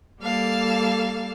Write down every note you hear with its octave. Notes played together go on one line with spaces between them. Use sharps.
G3 A#3 A4 F5 A5